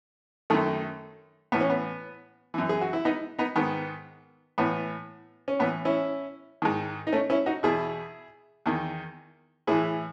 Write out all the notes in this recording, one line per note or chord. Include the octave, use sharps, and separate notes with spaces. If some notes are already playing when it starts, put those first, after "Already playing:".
F#2 D#3 A3
A2 E3 B3
C#4
B3
F#2 E3
G#4
F#4
E4
B3 D#4
B3 D#4
G#2 D#3 B3
A2 E3 B3
C#4
A2 E3 B3
C#4 E4
G#2 D#3
D#4
A3 C#4
C#4 E4
D#4 F#4
E2 B2 E4 G#4
E2 D#3
A2 E3 E4 G#4